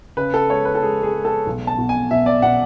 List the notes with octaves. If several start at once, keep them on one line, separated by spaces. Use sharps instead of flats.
C#3 B4
A4
G#3 C#5
B4
A4
G#3 G#4
G#4
G#3
A4
B1
A5
B2
G#5
B2 E5
D5
B2 F#5